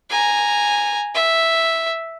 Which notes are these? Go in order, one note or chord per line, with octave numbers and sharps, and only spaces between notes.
G#5 A#5
E5